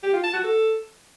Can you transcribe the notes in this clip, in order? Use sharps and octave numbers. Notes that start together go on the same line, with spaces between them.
G4
F4
A5
F#4
A4